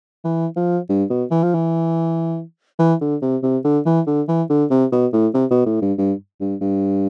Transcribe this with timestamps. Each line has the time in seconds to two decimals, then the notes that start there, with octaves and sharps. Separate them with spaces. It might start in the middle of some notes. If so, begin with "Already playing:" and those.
0.24 E3
0.56 F3
0.89 G2
1.10 B2
1.31 E3
1.43 F3
1.54 E3
2.79 E3
3.01 D3
3.22 C3
3.43 C3
3.64 D3
3.86 E3
4.07 D3
4.28 E3
4.50 D3
4.70 C3
4.92 B2
5.13 A2
5.34 C3
5.50 B2
5.66 A2
5.82 G2
5.98 G2
6.40 G2
6.61 G2